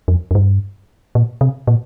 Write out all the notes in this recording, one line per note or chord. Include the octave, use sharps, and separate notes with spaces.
F2
F2
G2
A#2
C3
A#2